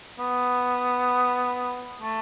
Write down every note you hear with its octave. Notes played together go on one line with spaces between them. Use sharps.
B3
A3